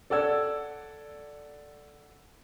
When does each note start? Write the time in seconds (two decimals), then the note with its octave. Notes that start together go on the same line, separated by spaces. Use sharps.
0.10 A4 D5 F#5 E6 G#6